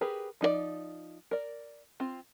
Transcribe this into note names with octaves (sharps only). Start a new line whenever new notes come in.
G4 G#4 A#4 B4
F3 D#4 G#4 D5
A#4 D5
C4 F4